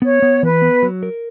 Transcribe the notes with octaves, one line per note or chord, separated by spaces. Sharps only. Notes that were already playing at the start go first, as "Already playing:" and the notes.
B3 C#5
B3
E3 B4
B3
F#3
A#4